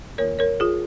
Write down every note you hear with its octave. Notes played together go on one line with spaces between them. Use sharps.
D#2 D#3 A#3 F4 A#4 C#5
A#4 C#5
F4 G#4